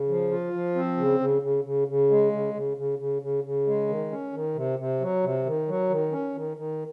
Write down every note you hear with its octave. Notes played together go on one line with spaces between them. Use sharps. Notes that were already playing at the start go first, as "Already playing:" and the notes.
Already playing: C#3
F3
F4
F3
C4
C#3
C#3
C#3
C#3
C#3
G#3
C#3
C#3
C#3
C#3
C#3
C#3
G#3
D#3
C#4
D#3
C3
C3
F#3
C3
D#3
F#3
D#3
C#4
D#3
D#3